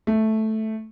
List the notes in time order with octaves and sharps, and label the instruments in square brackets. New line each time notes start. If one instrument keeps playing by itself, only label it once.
[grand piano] A3